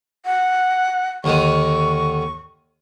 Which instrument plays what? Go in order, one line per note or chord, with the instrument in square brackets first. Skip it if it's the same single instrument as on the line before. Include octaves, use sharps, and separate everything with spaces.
[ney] F#5
[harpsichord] D#2 D3 D#3 [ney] C#6